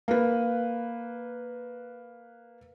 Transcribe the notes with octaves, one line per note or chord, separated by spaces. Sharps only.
A#3 B4